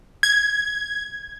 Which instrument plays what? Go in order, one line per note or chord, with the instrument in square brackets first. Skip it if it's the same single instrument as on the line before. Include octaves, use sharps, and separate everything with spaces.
[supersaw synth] G#6